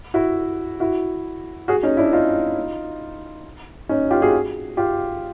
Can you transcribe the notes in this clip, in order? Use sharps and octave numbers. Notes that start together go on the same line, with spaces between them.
E4 F#4
E4 F#4
F#4 G#4
C#4 D#4
D4 E4
D#4 F4
C#4 D#4
F4 G4
F#4 G#4
F4 G4